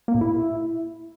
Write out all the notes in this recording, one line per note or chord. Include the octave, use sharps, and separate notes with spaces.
A#3
A#2
E4